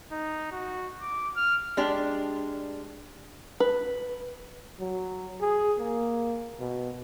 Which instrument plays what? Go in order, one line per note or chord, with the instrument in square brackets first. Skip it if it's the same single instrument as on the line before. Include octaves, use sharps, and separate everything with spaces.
[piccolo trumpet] D#4
F#4
D6
F6
[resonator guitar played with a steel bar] G#3 D4 G4
[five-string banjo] B4
[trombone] F#3
G#4
A#3
B2